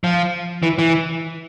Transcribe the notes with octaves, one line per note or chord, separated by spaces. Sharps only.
F3
E3
E3